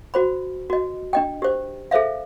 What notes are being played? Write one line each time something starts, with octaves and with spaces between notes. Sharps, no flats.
F#4 C5 B5
F#4 D#5
D4 D#5 G5
G4 C5
G#4 A4 C5 E5 F5